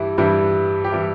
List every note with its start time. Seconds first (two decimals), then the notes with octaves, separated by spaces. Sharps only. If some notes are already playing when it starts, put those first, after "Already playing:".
Already playing: G2 E3 G3 E4
0.18 G2 E3 G3 E4
0.84 G4
0.92 E3 G3 E4